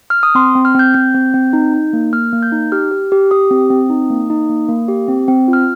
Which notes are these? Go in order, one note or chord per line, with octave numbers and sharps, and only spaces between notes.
F6
D#6
C4 C6
C4
F6
C4 G6
C4 G6
C4
C4
D#4
D#4
A#3
A#3 F6
A#3
G6
D#4
G4 F6
G4
G4
G4 D#6
C4
C4
D#4
A#3
D#4
A#3
A#3
G4
C4
C4
F4
F6